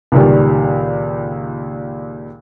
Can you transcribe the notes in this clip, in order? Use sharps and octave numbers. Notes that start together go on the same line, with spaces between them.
C#2 A#2 D#3 G3